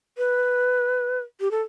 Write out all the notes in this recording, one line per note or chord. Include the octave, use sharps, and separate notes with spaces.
B4
G4
A4